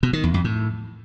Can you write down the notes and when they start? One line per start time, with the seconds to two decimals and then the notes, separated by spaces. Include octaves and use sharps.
0.03 B2
0.13 D#3
0.24 E2
0.34 F2
0.44 A2